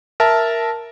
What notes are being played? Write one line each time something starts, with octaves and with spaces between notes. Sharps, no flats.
A#4 E5 A5